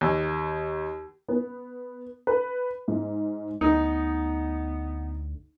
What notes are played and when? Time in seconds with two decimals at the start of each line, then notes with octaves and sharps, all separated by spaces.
0.01 D#2
1.28 B3
2.27 B4
2.88 G#2
3.61 D2 B3 D#4